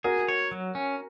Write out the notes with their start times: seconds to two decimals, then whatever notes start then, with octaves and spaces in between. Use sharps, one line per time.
0.04 F#4 G#4 A#4
0.28 C#5
0.51 F#3
0.75 C#4